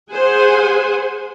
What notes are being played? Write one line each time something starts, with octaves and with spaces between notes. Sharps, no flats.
G#4 C5 F#5 G#5